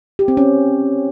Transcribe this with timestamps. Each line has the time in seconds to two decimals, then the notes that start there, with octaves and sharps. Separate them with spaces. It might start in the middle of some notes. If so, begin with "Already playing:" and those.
0.19 G4
0.28 C4
0.37 C#4